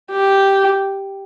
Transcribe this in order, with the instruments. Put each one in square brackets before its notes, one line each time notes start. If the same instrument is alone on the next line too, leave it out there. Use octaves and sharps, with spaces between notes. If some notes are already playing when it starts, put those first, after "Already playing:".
[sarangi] G4